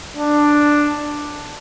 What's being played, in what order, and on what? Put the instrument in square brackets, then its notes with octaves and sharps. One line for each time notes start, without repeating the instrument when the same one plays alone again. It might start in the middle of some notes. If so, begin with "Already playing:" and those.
[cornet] D4